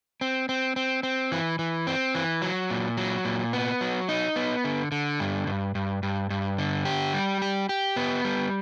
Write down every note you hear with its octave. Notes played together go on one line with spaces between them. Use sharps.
C4
C4
C4
C4
E3
E3
C4
E3
F#3
A#2
F#3
A#2
B3
F#3
D#4
B3
D3
D3
G2
G2
G2
G2
G2
D3
G4
G3
G4
G4
B3
G3